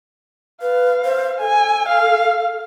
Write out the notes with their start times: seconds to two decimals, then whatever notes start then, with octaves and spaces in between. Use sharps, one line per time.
0.62 B4 F5
1.04 C5
1.40 A4 G#5
1.89 F5